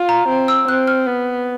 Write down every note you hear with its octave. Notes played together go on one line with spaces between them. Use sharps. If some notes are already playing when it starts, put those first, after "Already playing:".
Already playing: F4
A#5
C4
E6
C4 F#6
F6
B3